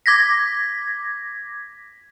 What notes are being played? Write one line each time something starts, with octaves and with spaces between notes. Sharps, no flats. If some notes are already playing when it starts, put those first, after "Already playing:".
D6 G#6 A#6 B6